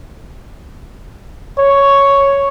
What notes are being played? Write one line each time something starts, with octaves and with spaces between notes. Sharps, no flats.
C#5